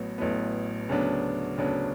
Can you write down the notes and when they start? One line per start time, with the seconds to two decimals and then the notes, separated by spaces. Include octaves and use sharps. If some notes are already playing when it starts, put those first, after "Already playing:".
Already playing: A1 A2 F#3 B3
0.18 A1 A2 F#3 B3
0.89 D2 C#3 F#3 B3 D4
1.58 D2 C#3 F#3 B3 D4